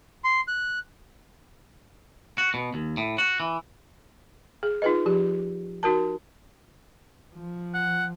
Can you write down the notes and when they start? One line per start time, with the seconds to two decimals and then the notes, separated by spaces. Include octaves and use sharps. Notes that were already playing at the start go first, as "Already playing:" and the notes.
0.24 C6
0.48 F#6
2.38 F#4
2.54 B2
2.74 D#2
2.97 A2
3.18 F#4
3.40 E3
4.63 G#4
4.82 D#4 F4 G#4 B4 D#5
5.06 F3 G4
5.83 D#4 F#4 A#4 A5
7.34 F3
7.74 F#5